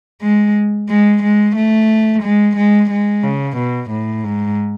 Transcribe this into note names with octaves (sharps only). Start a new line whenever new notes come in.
G#3
G#3
G#3
A3
G#3
G#3
G#3
C#3
B2
A2
G#2